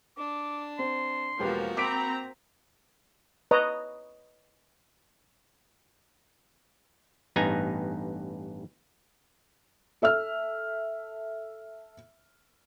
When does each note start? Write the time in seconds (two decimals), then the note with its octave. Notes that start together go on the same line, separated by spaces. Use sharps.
0.18 D4 D6
0.79 C4 C6
1.40 E1 F3 A#3 F#4 G4 B4
1.77 C4 A#5 B5 D6 B6 D7
3.51 B4 C#5 D#5 A#5
7.36 A1 G2 B3 D#4 G#5 A#5
10.02 A4 E5 E6 F6